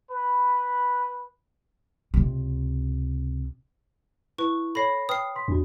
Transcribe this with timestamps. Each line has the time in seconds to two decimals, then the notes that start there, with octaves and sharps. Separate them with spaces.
0.10 B4
2.14 C#2 C3
4.38 E4 B4 C#6
4.75 A4 C#5 B5 A#6 C7
5.09 B4 G5 D#6 F6 C7
5.36 C6 B6
5.48 E2 D4 F#4